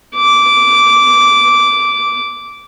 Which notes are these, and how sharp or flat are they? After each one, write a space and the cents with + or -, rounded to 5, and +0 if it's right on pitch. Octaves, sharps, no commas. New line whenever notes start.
D6 -10